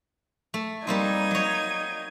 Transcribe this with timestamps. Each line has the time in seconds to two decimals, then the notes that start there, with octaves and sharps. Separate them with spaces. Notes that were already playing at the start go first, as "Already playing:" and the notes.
0.54 A3
0.87 G3 A#3 C4 D#4 G#6 D#7
1.31 F#3 C#5